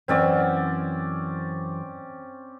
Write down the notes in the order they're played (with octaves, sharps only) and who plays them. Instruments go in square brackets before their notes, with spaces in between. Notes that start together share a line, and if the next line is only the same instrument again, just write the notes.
[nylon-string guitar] F#2 E3 F#5 [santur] C4 C#4 D5